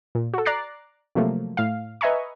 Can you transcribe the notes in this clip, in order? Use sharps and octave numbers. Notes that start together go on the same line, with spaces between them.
A#2
F#4 A4
D5 A#5 D6 F#6 A6 C7
C3 F3 F#3 A3 A#3
A2 F5
B4 D#5 E5 G#5 A#5 C#6